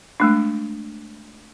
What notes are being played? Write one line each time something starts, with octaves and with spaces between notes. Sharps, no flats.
G#3 A3 D4